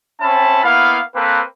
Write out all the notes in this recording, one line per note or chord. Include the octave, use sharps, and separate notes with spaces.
C4 C#4 E5 A5 B5
A#3 B3 E4 F5
A#3 C4 A4 B4